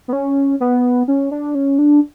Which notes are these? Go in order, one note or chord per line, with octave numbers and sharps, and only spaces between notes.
B3
C#4
B3
C#4
D4
C#4
D4